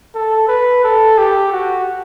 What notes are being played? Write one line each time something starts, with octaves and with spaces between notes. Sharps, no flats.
A4
B4
A4
G4
F#4